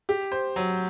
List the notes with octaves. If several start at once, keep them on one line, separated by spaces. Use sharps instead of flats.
G4
C5
F#3